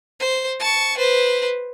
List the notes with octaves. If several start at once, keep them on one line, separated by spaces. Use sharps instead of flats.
C5
A5 C#6
B4 C5